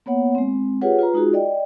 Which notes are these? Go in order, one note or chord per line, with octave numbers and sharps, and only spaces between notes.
A#3 B3 C#5 F#5
G#3 C4
F4 G4 G#4 B4 C#5 F#5
F4 B4 A#5
G#3 D#4 F4 F#4 G#4
D5 D#5 G5